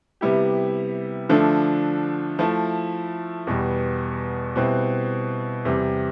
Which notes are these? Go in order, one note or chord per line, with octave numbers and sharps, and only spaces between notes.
C3 G3 B3 E4 G4
D3 F3 A3 D4 A4
F3 A3 E4
E2 B2 G3
B2 G3 C4 E4 B4
E2 C3 G3